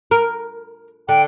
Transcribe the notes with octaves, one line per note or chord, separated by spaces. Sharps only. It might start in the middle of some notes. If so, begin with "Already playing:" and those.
A#4
D3 G5